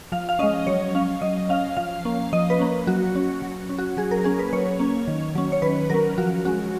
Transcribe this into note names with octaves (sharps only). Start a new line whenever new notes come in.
F3 F5
F5
G#3 C#4 D#5
F#3 C#5
C#4 F5
F#3 D#5
C#4 F5
F3 F5
A#3 C#4
F3 D#5
B4
A#3 C#4
F#3 F#4
C#4
F#3
C#4
F#4
F#3 G#4
A#4
A#3 C#4 G#4
B4
F#3 C#5
A#3 C#4
D#3
F#3 C#4
C#5
D#3 B4
F#3 C#4 A#4
F3 F#4
G#3 C#4 F#4